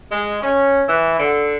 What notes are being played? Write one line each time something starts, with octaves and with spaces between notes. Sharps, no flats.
G#3
C#4
E3
D3